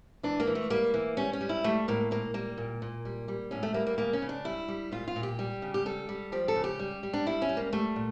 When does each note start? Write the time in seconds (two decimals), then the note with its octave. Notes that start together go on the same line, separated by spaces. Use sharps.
0.23 E3 D4
0.40 A#3
0.47 E3
0.55 A3
0.70 G3 A#3
0.94 E3
1.17 G3 C#4
1.33 C#4
1.41 G3
1.49 E4
1.64 G3 A3
1.88 A2 A#3
2.11 A#2 A#3
2.34 G3 A#3
2.58 A#2
2.82 A#2
3.05 G3
3.28 G3
3.51 A2 C#4
3.63 A3
3.74 G3 A#3
3.87 A#3
3.98 C#3 A#3
4.13 C#4
4.22 C#3
4.29 D4
4.45 G3 E4
4.68 G3
4.92 A#2 F4
5.08 F4
5.16 A#2
5.23 G4
5.39 G3
5.62 C#3
5.74 G4
5.86 G3 A4
6.09 G3
6.32 F3 G4
6.48 A4
6.56 C#3
6.64 G4
6.79 G3
7.03 G3
7.13 D4
7.26 G3 E4
7.42 C#4
7.49 G3
7.57 A#3
7.73 G3 A3
7.96 A#2